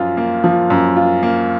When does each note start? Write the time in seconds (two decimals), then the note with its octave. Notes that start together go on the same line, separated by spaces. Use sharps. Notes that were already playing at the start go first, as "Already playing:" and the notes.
Already playing: F#2 F3 F4
0.17 A#3
0.44 F3
0.70 F#2
0.96 F4
1.23 A#3